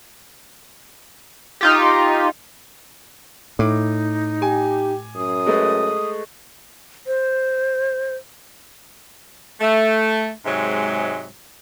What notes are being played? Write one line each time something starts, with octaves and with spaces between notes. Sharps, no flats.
D#4 F4 G4
A2 D#4 D6
G4 G#5
F#2 D#6
G#3 A3 B4
C5
A3
G#2 C3 F#3 G#3